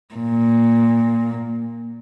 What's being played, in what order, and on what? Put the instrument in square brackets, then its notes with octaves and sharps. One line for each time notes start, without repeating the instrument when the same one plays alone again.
[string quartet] A#2